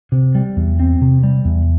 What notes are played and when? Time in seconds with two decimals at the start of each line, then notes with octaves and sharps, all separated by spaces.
0.12 C3
0.35 G3
0.57 E2
0.80 C4
1.02 C3
1.23 G3
1.45 E2